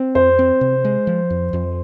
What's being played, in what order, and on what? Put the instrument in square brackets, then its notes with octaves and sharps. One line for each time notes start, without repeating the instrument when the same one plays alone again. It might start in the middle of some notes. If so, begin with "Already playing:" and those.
Already playing: [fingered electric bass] C4 [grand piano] C5
[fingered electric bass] F2 [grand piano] C5
[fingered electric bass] C4
C3
G#3
F3
F2
F2